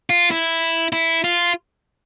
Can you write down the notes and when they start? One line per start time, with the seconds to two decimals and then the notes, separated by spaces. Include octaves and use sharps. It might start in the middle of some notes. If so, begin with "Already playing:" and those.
0.10 F4
0.31 E4
0.93 E4
1.24 F4